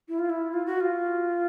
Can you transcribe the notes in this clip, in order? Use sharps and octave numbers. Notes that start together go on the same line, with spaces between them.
E4
F4
E4
F4
F#4
F4